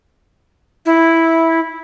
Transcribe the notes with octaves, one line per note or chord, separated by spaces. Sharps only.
E4